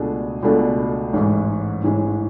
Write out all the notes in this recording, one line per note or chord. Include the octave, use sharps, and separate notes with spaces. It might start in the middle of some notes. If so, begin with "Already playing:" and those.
Already playing: C#2 B2 A3 D4 G#4
C#2 B2 A3 D4 G#4
A1 G#2 E3 G#3 C#4
A1 G#2 E3 G#3 C#4